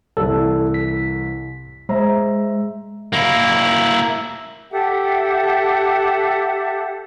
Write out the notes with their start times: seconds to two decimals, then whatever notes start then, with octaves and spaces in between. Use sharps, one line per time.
0.17 C2 E3 A4
0.74 B6
1.89 G#3 C5 E5 A#5
3.13 A#3 E4
4.71 G4 A4 E5 F#5